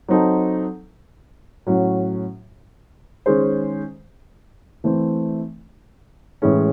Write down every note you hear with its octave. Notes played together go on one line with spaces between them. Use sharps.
F#3 C4 D#4 A4
A2 F#3 C#4 F#4
D#3 G#3 C#4 G#4 C5
E3 A3 C4
A2 E3 G#3 C#4